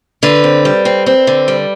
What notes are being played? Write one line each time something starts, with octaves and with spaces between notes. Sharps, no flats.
D3 B4
C4
G3
C4
C4
D3
G3